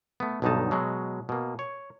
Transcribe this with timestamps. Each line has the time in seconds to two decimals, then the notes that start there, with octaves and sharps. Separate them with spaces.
0.20 A3 B3
0.42 B1 G2 B2 D3 D#4 A5
0.71 B2 F#3 G#3
1.29 B2 A#3
1.59 C#5